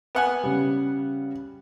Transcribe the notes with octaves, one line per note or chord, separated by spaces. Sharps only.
B3 F#5 G#5
C#3 G3